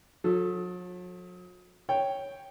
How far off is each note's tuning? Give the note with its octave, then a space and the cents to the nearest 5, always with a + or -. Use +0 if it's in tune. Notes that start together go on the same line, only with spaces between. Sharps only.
F#3 -45 A4 +0
C#5 +0 G5 +0